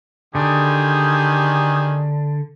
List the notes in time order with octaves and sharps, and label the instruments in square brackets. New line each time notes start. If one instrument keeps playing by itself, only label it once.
[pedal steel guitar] D3 [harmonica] D#3 G4 G#4